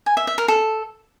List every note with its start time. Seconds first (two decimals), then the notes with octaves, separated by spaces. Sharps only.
0.06 G#5
0.17 E5
0.27 E5
0.38 A#4
0.48 A4